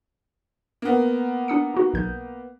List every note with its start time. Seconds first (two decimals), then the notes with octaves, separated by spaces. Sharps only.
0.82 A#3 B3
1.48 D4 D#6 C#7
1.74 D#4 F#4
1.94 B1 G6